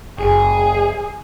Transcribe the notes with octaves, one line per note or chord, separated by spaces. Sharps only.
F#1 G#4